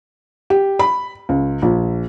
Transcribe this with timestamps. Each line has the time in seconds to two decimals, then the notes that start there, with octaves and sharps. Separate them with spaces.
0.50 G4
0.79 B5
1.29 C#2
1.62 A#1